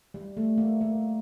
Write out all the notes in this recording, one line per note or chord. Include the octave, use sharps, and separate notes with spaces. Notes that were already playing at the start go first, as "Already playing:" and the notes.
G3
A3
A#3
A#3